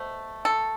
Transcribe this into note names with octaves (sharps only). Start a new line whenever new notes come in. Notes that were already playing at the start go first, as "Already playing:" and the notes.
Already playing: B2 A3 C5
A4